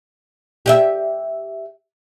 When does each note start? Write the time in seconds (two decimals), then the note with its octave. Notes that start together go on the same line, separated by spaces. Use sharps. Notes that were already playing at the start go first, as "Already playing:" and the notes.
0.66 G4 D#5 E5